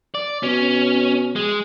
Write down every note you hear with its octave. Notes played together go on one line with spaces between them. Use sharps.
D5
B2 C#4
G#3